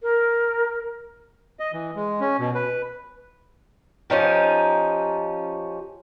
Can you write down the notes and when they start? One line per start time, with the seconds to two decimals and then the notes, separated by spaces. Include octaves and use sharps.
0.03 A#4
1.60 D#5
1.73 E3
1.96 G#3
2.21 C#4
2.39 B2
2.55 B4
4.10 F3 C#4 D#4 G4